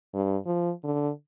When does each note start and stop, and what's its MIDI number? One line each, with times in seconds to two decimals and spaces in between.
0.14 0.37 43
0.46 0.72 53
0.84 1.10 50